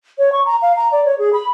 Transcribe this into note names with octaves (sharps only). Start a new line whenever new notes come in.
C#5
C#6
A#5
F5
A#5
D5
C#5
G#4
B5